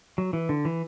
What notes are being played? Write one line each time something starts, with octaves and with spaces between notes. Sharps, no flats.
F#3
E3
D3
E3